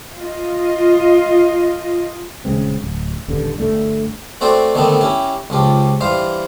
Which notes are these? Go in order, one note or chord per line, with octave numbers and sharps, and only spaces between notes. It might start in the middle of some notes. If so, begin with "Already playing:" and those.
F4 D#5
D#1 C#3 G#3 C4
D1
D#1 G2 D3
G1 A2 A3 D4
A3 C4 F#4 C5 D5
D3 D#3 A3 B3 C4 D4
C#4 E4 G4
C#2 F3 G4
G2 E3 C5 F5